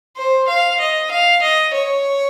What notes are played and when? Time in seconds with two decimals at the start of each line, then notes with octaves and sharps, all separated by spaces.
0.16 C5
0.48 F5
0.79 D#5
1.11 F5
1.42 D#5
1.74 C#5